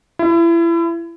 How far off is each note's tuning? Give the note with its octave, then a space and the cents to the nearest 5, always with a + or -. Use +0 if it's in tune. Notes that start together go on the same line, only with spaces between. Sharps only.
E4 +30